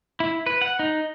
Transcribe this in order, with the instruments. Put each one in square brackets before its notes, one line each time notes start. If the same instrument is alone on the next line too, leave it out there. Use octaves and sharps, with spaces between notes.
[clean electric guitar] E4
B4
F#5
D#4